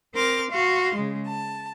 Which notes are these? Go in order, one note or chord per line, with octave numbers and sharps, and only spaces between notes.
C4 A#4 C6 D6 F6
F#4 F5 C6
C#3 G#3
A5